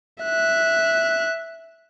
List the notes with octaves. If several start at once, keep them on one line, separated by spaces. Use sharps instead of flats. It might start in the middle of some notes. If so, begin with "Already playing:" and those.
E5 F#6